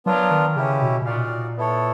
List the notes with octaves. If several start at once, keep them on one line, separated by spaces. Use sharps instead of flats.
F#3 B3 D4 F4 A#4
D#3
C#3 C#4 E4 G4
B2
B2
A#2 D#4 F#4 A#4 D5 F5
B3 E4 A4 C#5